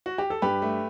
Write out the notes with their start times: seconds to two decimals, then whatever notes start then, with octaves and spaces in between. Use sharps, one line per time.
0.06 F#4
0.18 G4
0.30 A4
0.42 G2 G4 B4
0.62 A3